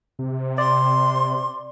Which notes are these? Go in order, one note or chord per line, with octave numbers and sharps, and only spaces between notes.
C3
D5 C6